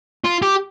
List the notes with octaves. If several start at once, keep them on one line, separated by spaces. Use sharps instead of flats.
F4
G4